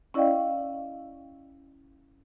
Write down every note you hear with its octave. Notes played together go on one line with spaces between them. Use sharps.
C#4 E4 D5 D#5 F5 G5